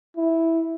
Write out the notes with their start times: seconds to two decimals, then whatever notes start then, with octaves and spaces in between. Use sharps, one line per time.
0.17 E4